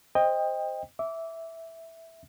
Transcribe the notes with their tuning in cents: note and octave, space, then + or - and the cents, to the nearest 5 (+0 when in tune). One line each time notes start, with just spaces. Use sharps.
C5 +0 D#5 +0 G5 +25
E5 -5 D6 -20